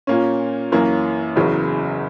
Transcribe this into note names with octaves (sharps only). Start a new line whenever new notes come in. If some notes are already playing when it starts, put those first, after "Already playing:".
A#2 A#3 C#4
F#2 E3 A#3 C#4
F#1 E2 C#3 F#3